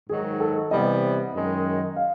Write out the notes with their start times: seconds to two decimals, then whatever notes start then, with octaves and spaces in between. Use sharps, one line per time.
0.09 G#2 D#3 F#3 G#4
0.40 A4
0.71 C3 E3 G3 B3 D#5
1.33 F#2 D#3 G#3
1.96 F5